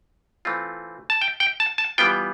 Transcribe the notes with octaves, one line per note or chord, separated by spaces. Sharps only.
E3 A3 C4 F4
A5
G5
G5
A5
A5
E3 G3 B3 F4 G5